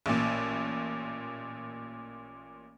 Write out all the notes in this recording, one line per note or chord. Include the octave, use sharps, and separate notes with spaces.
A1 A#2